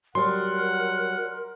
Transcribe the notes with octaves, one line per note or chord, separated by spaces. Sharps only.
F#3 G3 A#4 F#5 C6